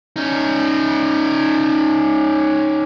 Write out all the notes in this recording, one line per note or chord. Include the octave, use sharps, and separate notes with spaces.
C#4 D#4